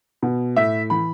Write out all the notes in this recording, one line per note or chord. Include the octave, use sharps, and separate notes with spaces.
B2
A2 E5
E3 B5